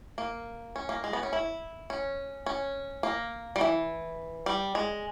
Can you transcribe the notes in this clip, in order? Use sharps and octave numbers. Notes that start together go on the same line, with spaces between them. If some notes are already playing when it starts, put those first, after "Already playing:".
A#3
C#4
A#3
G#3
B3
C#4
E4
C#4
C#4
A#3
G3
E3
G3
G#3